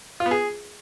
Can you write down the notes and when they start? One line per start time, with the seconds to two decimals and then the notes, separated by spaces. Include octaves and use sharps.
0.20 F4
0.26 B3
0.31 G#4